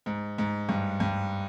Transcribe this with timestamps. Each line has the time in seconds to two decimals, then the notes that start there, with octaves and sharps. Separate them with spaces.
0.06 G#2
0.38 G#2
0.69 G2
1.00 G2